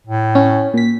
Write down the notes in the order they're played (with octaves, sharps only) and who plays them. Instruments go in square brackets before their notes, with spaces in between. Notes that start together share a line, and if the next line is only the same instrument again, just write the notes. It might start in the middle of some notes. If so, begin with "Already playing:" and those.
[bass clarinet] A2
[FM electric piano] C#4
A#2 B6